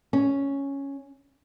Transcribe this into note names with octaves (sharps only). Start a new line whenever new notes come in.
C#4